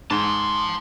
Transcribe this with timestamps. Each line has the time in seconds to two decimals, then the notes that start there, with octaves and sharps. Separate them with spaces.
0.10 G#2 A5 C6